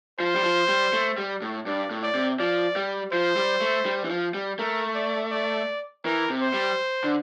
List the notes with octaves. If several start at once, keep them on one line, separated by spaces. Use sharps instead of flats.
F3 C5
G3
F3
G3
A3
G3
A2
G2 D5
A2
D5
C3
F3 D5
G3
F3 C5
G3
A3
G3
E3
F3
G3
A3 A#4
D5
D5
E3 A#4
C3
C5
G3
D3